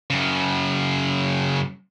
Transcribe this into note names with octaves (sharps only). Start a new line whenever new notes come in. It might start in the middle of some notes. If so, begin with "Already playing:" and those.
F#2 C#3